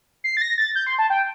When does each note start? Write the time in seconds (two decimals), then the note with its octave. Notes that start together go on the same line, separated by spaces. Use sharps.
0.24 C7
0.37 A6
0.42 A#6
0.58 A6
0.75 G6
0.87 C6
0.99 A5
1.10 G5